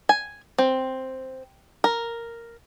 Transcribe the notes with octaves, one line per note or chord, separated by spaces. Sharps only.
G#5
C4
A#4